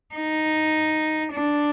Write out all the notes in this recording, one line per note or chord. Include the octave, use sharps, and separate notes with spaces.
D#4
D4